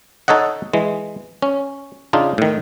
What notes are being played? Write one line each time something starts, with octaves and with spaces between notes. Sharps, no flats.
D#4 A4 C#5 D#5 F#5
E3 G#3
C#4
C#3 D4 D#4 F4
A2 D#3